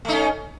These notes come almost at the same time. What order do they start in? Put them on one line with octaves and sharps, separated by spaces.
A3 D#4 C#4